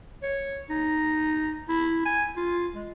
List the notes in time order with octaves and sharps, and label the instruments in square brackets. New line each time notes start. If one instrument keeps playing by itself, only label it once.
[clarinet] C#5
D#4
E4
G#5
F4
G#3